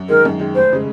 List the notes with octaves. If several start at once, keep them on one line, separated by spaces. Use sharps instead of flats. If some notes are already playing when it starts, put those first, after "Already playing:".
Already playing: F#2
D#3 G#3 A#4
F#2
D#3 G#3
F1 C5
C#3 G#3